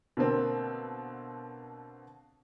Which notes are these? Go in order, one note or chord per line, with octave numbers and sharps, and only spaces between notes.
B2 D3 A#3 C4